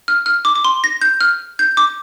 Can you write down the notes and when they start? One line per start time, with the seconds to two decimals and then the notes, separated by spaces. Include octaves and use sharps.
0.08 F6
0.26 F6
0.45 D6
0.56 D6
0.65 C6
0.84 A#6
1.02 G6
1.21 F6
1.59 G6
1.77 D6